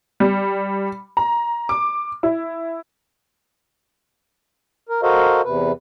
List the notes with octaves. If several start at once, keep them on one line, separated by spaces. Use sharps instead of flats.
G3
A#5
D6
E4
A#4
F#4 A4 A#4 C5 D#5 F5
E2 C3 B4